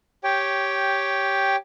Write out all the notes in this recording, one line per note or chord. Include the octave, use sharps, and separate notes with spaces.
G4 C#5 G5